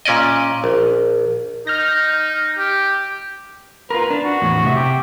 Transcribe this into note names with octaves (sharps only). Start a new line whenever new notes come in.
A#2 C#4 D5 D#5
A#1
D#4 F6 G6 A#6
G4
F4 A#4 B4
D4
F#4
E2 A2
C3 G#4 E5
G4